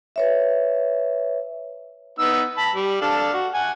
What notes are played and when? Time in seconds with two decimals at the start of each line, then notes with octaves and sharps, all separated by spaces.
0.16 B4 C#5 E5
2.19 B3 D#4 E6
2.57 A5 B5
2.75 G3
3.01 D4 A4 F5
3.33 F#4
3.54 F#5 G#5